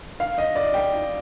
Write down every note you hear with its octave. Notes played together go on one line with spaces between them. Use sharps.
F5
D#5
D5
G5